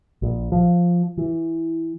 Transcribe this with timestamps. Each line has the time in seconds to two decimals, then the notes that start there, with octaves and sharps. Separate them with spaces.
0.22 A#1
0.52 F3
1.17 E3